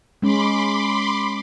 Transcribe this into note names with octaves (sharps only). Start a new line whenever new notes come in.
G#3 C#4 B5 C6 D6